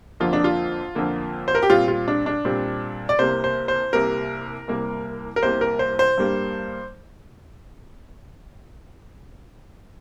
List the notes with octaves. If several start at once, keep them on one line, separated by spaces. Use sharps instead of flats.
F2 D3 A#3 F4
D4
F4
F2 D3 A#3
C5
A#4
G4
A#2 G3 C4 F4
F4
D4
D4
A#2 G3 C4
D5
C2 C3 A#3 C5
C5
C5
C2 C3 A#3 A#4
C2 C3 G3 A#3
A#4
C2 C3 G3 A#3 C5
A#4
C5
C5
G2 G3 A#3